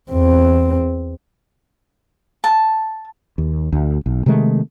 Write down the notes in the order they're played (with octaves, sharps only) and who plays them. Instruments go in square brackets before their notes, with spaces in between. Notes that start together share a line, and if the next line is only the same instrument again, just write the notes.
[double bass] E2 C4
[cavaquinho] A5
[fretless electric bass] D#2
D2
B1
C3 D#3 G#3 A3